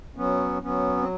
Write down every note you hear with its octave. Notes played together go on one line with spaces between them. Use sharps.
F#3 B3 C#4
F#3 B3 C#4
C4